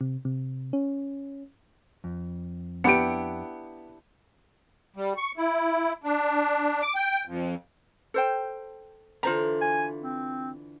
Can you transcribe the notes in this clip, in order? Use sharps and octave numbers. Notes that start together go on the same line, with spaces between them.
C3
C3
C#4
F2
B3 D4 E4 G4 C#7 D7
G3
C#6
E4
D4
D6
G5
F2
A4 C5 G5
D3 E3 F4 C5 A#5
G#5
C4